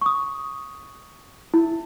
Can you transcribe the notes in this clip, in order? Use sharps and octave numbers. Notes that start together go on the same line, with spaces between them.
C#6 D#6
E4